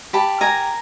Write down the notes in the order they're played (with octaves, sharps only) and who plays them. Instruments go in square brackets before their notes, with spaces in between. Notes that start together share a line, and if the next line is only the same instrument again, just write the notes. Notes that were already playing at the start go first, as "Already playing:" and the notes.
[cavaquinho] G4 A5 B5
A#4 G#5 A#5